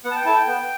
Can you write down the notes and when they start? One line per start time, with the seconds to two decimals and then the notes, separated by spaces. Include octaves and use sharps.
0.04 B3 F#5
0.11 A5
0.16 G5
0.25 E4 A4 A5
0.36 G5
0.47 B3